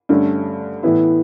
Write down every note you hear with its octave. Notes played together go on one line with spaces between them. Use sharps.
G2 D3 A3 C#4
A2 E3 B3 E4